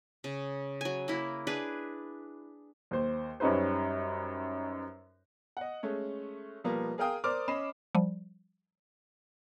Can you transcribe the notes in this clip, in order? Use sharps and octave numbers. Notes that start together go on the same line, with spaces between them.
C#3
F#3 G#5
A#3 E4
D4 G#4 B4
D#2 C5
F#2 G3 C#4 D#4 B4 C5
D#5 F#5
G#3 A3 C#4
B2 F3 G3 A#3 B3
G#4 A#4 F5 G5 D#6
A#4 C5 D5 D6 F6
C#4 D#5 B5 C7 E7
F3 G3